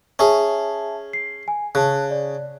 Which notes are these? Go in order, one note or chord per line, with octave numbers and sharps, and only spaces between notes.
C#4 G#4 E5 G#5 A5
C7
G#5
C#3 A5 F#6
D5